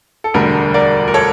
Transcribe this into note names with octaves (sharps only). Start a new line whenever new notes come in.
A4
E1 D2 D3 G3 A#4
A#4 D5
A#4
A4 C#5